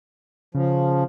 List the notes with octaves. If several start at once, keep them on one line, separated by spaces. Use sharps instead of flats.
C#3 F3